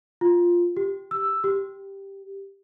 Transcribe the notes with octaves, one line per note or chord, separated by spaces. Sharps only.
F4
G4
E6
G4